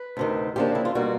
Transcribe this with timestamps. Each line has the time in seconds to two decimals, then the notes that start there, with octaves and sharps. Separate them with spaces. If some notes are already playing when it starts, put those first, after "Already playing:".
Already playing: B4
0.17 D2 C3 D#3
0.56 C#3 F3 A#3 D4 G4
0.75 E4
0.85 F4
0.95 B2 G3 A#3 F#4